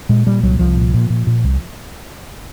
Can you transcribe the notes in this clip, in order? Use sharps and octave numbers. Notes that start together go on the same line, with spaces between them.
A#2 G#3
A#2 G3
C2 F#3
C2 F3
A#2
A#2
A#2
A#2
C2